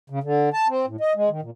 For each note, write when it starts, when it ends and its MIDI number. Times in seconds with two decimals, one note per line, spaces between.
0.10 0.19 49
0.23 0.49 50
0.53 0.68 81
0.68 0.86 60
0.87 0.97 45
1.01 1.13 75
1.15 1.29 56
1.29 1.41 51
1.42 1.50 46